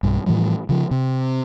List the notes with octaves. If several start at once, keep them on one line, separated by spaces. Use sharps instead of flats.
B1 G2
A2 E3 F3 G3
C#3 F3
C3